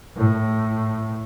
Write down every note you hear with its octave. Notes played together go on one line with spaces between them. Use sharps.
A2